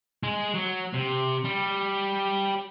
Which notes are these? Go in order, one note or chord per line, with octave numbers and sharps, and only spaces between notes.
G#3
F#3
C3
G3